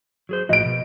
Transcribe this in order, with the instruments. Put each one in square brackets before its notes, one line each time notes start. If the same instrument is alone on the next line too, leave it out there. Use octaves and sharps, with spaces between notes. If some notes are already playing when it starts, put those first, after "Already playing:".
[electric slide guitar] F#3 G#4 C5
[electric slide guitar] A2 F3 F#4 [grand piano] D#5 D7
[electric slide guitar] B2